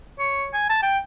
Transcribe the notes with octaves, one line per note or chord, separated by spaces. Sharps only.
C#5
G#5
A5
G5